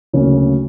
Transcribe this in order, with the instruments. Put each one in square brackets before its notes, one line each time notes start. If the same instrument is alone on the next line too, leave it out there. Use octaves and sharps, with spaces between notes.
[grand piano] D2 C#3 F#3 A#3 C#4